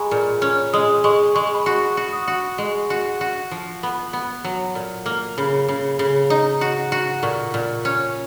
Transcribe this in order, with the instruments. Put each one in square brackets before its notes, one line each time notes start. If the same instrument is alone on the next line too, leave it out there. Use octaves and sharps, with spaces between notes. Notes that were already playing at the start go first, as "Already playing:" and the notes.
Already playing: [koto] G#3 [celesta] F#5 G#5 A#5 B5 C#6
[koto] A#2
C#4
[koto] G#3 [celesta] D#6
[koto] G#3 [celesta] C#6
[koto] G#3 [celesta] C#6
[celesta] B5
[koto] F#4 [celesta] C#6
[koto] F#4
[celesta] D#6
[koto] F#4
[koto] G#3 [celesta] C#6
[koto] F#4
F#4
F3
B3
B3
F#3
A#2
A#3
[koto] C#3 [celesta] B5
[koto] C#3
C#3
[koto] D#4 [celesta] A#5
[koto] F#4
F#4
[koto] A#2 [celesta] C#6
[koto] A#2
C#4